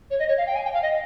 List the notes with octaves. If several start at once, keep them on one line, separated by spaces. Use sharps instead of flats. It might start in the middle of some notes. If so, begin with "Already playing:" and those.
C#5
D#5
C#5
F5
G5
G#5
G5
F5
D#5